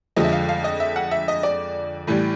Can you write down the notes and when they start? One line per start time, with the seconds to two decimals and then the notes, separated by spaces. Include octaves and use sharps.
0.16 F2 D3 F3 G#3 D#5
0.24 E5
0.32 F5
0.49 F5
0.64 D#5
0.80 E5
0.96 F#5
1.11 E5
1.28 D#5
1.43 D5
2.07 A2 E3 G3